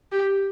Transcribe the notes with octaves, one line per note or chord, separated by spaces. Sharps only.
G4